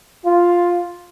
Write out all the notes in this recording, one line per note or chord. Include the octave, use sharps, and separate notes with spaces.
F4